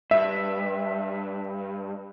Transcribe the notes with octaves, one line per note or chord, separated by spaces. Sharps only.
G2 E5